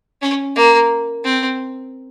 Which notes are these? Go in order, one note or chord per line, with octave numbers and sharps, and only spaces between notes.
C#4
A#3
C4